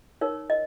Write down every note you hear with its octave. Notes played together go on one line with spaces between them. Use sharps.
D#4 A#4 C#5
D#5